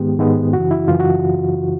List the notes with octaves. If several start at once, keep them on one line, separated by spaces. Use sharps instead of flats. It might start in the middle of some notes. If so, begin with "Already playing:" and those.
Already playing: G#2 D#3 G#3 B3 G4
G#2 D#3 G#3 B3
F#2 C#3 E3 F#4
E4
F#2 C#3 E3 F4
F#4